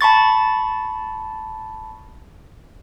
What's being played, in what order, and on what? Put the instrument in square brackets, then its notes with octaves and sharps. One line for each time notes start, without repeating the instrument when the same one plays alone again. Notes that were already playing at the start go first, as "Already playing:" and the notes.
[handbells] A5 B5 C#6 A6